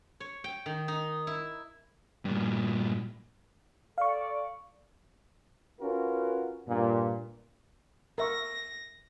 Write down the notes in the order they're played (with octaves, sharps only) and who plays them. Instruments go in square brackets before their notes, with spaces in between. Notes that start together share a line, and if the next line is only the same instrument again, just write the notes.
[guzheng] C#5
G5
D#3
D#4
E4
[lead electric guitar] G2 A#2
[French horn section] A4 D5 [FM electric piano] F5 C#6
[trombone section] C#4 F4 F#4 A#4 B4
G2 A#2
[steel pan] A#4 E5 C#6 [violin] A#6